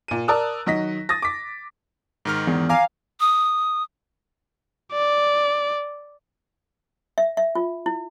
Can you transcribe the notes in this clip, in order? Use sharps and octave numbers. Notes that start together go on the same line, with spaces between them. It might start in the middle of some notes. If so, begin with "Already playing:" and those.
A#2 D#7
A#4 D5 A5 D#6 E6 F#6
D#3 F#3 D#5 A#6 B6
D#6 A6 A#6
D6 B6
G#2 D#3 F6
E2
F5 G#5 A#5 D6
D#6
D5
E5
E5
F4
E4